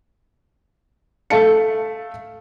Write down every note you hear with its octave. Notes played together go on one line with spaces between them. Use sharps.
A3 F5 A5 C#7